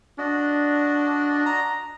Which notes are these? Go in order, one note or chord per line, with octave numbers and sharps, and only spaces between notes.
D4 F#4 D5 D#5
A#5